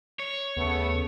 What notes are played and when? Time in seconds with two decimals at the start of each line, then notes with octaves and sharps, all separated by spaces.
0.19 C#5
0.57 D#2 C#3 A3 B3